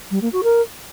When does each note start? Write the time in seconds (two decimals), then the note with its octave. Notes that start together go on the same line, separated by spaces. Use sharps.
0.11 G3
0.22 A#3
0.33 F#4
0.43 A#4